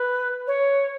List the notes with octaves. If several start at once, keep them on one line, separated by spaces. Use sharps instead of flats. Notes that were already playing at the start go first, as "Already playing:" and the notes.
Already playing: B4
C#5